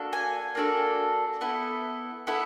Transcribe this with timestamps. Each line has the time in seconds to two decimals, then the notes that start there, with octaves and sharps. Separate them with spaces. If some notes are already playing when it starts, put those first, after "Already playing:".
Already playing: A#3 D4 F#4 A4
0.13 G#5
0.55 A#3 D4 F#4 A4
1.41 B3 E4 A4
2.27 B3 E4 A4